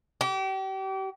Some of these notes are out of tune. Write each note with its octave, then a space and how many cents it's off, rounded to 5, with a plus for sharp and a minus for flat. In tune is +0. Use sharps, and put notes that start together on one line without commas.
G4 -35